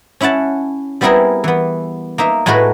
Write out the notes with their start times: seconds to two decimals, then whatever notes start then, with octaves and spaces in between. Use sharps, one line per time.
0.21 C#4 E4 E5 F#5 A5
1.01 G3 B3 C4 E4 G#4 A#4
1.44 E3 B3
2.18 A#3 D#4 E5
2.46 A2 G#3 A3 F#4 A#4 B4